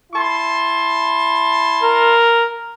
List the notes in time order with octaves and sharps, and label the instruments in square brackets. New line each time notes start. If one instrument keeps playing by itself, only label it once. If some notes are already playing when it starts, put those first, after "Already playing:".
[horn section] E4 A5 C6
[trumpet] A#4